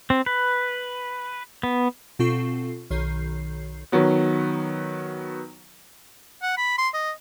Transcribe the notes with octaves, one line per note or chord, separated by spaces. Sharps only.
C4
B4
B3
B2 C4 F4 A4 C#6 C7
B1 D#3 C#5 G6 C7
D#3 F#3 B3
F#5
B5
C6
D#5